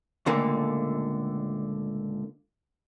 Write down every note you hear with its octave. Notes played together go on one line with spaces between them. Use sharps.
C#2 A#2 D3 A3 A#3